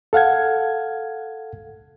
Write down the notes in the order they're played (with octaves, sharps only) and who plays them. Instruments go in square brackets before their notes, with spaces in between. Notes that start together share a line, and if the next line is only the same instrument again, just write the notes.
[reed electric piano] A4 F5 F#5 G#6